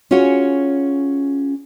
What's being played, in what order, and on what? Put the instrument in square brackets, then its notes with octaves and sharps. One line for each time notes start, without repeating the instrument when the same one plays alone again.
[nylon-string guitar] C#4 F4 F#4 G#4 C#5